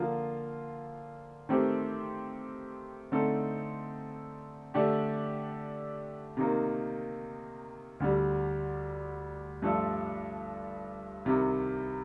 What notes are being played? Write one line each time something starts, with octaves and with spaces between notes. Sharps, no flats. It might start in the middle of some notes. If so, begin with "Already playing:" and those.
Already playing: D3 F3 A#3 F4
D#3 A3 C4 G4 C5
D3 A3 C4 D#4 A4
D3 A3 D4 G4
C3 D#3 A#3 D#4
D2 D3 G3
G2 F3 A3 D4 A4
C2 C3 D#3